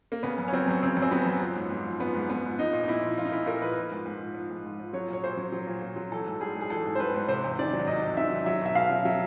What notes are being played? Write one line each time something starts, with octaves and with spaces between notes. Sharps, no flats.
A#3
C#3 B3
F#2
C#4
F#3 C4
F#2 C#4
C#3 C4
F#2
C4
F#3 B3
F#2
F3
G#2
G#2
F3
F3 B3
G#2
G#2 B3
F3
F3 D#4
A#2
D#4
A#2 E4
F3
F3 F4
D#4
A#2 E4
A#2 A#4
F3 B4
F3
G#2
G#2
F3
F3
G#2
G#2
F3
F#3 C#5
A#2
C#5
A#2 C5
F#3
F#3
A#2
A#2
F#3
E3 A4
G#2
G3 G#4
G#2
G#4
E3 A4
G#2
C5
G3 B4
G#2
C3 C5
E2
D#3 D5
F#3
C3 D#5
E2
D#3 E5
F#3
F#3 E5
B2 E5
B2 F5
F#3
F#3 E5